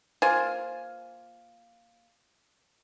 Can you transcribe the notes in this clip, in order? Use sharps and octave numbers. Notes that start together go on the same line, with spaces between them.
A#3 F4 C5 G#5